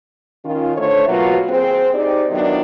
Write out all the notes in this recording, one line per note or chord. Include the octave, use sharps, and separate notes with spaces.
D#3 C#4 F4
D3 A3 A4 C5 C#5
B2 F#3 A#3 F4 F#4 B4
C4 G#4 C5
D#4 G4 G#4 C5 D5
D#3 F#3 B3 D4 E4